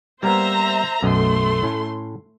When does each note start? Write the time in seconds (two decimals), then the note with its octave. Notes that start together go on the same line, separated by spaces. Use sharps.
0.23 G3 A#3 B3 C5 E5 A#5
1.02 B1 F#2 A3 D#5 C6
1.63 A2 C#4